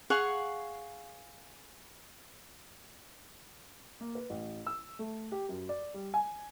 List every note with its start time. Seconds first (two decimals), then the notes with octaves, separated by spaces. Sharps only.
0.10 G#4 F5 F#5 C#6
4.01 A#3
4.15 B4
4.30 A1
4.67 E6
4.99 A3
5.32 G4
5.49 F#2
5.69 D5
5.94 G3
6.14 G#5